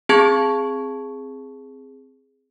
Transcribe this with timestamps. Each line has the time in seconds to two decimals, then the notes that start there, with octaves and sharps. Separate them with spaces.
0.09 C4 G#4 A5 C#6 G#6